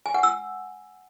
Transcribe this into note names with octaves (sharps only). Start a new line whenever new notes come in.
G#5
F#5
E6